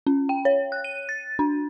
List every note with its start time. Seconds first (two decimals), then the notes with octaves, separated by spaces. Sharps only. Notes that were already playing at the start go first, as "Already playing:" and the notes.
0.07 C#4
0.29 G5
0.45 C#5
0.72 F#6
0.84 D#7
1.09 A6
1.39 D4